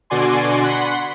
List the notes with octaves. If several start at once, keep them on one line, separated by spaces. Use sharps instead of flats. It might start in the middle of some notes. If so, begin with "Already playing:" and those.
B2 D3 F#4 D5 G#5 C6
F#5 B5 C6